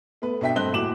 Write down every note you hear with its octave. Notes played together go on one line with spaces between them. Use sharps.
A3 B3 B4
B2 D4 E5 G5 B6
G2 A3 C4 D#5 F#6 G7
D#1 A2 F#4 D6 E7 F#7